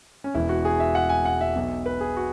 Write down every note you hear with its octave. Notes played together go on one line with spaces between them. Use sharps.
C#4
E1 E2 E3 E4
F#4
G#4
E5
F#5
G#5
F#5
E5
B1 B2 F#3
B4
G#4
F#4